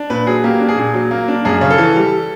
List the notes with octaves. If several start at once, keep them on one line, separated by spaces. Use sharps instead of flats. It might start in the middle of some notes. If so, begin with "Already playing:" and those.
Already playing: D4
A#2 B4
F#3 G#4
A#3 G4
D4
G#4
A#2
F#3
A#3
D4
F#2 G#4
C#3
A4
E3
G3